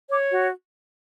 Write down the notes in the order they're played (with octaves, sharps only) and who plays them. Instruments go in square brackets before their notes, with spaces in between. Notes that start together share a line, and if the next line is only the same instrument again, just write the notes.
[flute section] C#5 D6
F#4